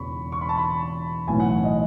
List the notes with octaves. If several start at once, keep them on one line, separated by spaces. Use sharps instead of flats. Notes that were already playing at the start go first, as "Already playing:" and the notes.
Already playing: E1 E2 C#3 B5 C#6
C#6
B5
A5
B5
B1 A2 E3 G#5
F#5
D#5